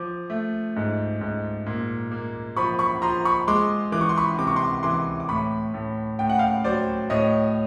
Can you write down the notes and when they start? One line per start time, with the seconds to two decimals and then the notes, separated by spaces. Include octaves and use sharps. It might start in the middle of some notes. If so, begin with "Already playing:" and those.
Already playing: F3 D6
0.30 A3
0.76 G#2
1.21 G#2
1.66 A#2
2.12 A#3
2.57 F3 B5 C#6
2.79 B5 C#6
3.02 F3 A#5 C6
3.25 B5 C#6
3.48 G#3 C6 D6
3.92 E3 D6
4.01 C#6
4.09 C6
4.18 B5 C#6
4.38 C3 D6
4.47 C#6
4.56 C6 D6
4.83 E3 C6 D6
5.20 D6
5.29 A2 B5 C#6
5.74 A2
6.19 A2 G5
6.29 F#5
6.39 F5 G5
6.64 F#3 C5 D5
7.10 A2 C#5 D#5